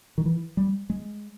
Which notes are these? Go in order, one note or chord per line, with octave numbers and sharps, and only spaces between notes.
D#3
E3
G3
G#3